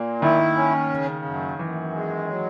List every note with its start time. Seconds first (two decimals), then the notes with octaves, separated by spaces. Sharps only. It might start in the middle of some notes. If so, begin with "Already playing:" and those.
Already playing: A#2 A#3
0.22 D#3 E4
0.56 C#4
0.90 C#3
1.25 F#2
1.59 F#2 E3
1.93 G#3
2.27 F#3